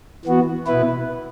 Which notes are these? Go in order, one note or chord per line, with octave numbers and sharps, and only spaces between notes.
E3 B3 F#4
B2 B3 E4 B4